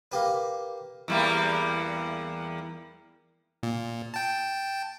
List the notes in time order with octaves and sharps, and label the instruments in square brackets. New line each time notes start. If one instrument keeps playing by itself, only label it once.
[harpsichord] A#3 G4 B4
[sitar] E2 G3 A#3
[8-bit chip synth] A#2
G5 A5